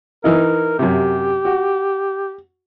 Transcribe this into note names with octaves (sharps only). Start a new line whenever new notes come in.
E3 D#4 E4 A#4
F#2 C3 G4
F#4